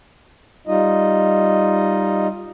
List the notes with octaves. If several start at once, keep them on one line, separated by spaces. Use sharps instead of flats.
G3 D#4 F4 D#5